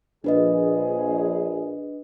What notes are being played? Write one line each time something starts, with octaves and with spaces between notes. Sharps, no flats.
A#1 D4 G#4 B4 D#5